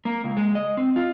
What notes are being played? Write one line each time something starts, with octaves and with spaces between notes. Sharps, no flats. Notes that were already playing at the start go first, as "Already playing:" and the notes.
A#3
C#2
G#3
D#5
C4
F4